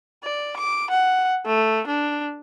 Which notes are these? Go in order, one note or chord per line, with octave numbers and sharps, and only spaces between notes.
D5
D6
F#5
A3
D4